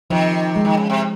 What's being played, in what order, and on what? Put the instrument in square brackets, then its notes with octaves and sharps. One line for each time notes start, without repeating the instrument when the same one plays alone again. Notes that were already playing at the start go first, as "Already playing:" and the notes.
[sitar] C3 D#3 [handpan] F3
[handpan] G#3
[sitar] D#3
C#3
C3